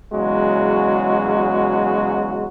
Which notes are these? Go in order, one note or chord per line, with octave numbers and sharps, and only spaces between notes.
E2 C#3 F#3 G#3 F#4